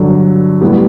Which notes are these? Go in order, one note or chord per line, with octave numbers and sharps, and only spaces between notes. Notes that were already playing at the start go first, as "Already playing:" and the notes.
Already playing: G2 D3 F#3
A2 G3 B3 E4 G4